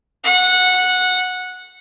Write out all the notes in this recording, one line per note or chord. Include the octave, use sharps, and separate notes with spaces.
F#5